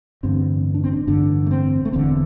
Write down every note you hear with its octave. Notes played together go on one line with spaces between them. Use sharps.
A1 G2 D3 C4
D4
C4
D4
A1 G2 D3 D4
A3
C4
A3
E1 E2 D3 C4